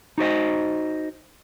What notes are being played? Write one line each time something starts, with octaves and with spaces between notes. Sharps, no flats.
D#4 F#4 C5 D#5